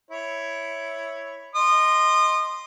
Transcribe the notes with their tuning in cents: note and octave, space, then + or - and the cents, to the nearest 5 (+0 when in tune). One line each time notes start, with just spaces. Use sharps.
E4 +0 C#5 +0
D#5 +5 C6 +0 D#6 -30